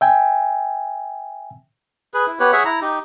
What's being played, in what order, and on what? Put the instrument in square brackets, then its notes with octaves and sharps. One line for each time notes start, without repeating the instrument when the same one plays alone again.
[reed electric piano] E5 G5 G#5
[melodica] G#4 B4
E4
B3 G4 B4 C#5
G#4 C#5 E5 F#5
E4 A#5
D#4 G4